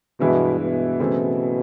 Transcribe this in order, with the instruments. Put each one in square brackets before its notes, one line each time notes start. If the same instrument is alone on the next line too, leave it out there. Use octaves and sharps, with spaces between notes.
[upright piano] G2 E3 G#3 B3 E4 [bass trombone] B2
[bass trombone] B2
[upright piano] C#3 E3 A3 C4 E4